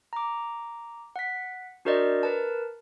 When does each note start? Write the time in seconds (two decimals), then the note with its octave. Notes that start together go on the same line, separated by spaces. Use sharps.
0.13 A#5 D6
1.16 F#5 B6
1.85 D4 F#4 A#4 C5 D5 D#5
2.23 A#4 B4 A5